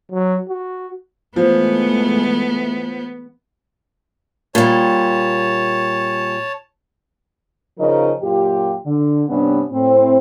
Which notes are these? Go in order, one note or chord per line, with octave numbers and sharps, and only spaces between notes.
F#3
F#4
E3 F3 G#3 A3 B3
A#2 G3 C#5 A5
C#3 F3 D#4 A#4 D#5
F#2 A#2 F4 G4
D3
G2 C3 B3 C#4 D4
A2 C4